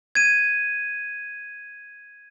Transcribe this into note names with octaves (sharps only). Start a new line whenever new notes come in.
G#6 D#7